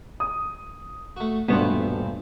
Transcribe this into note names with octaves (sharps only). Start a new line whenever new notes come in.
D#6
A3 F#4
D#1 G2 B2 A3 B3 C4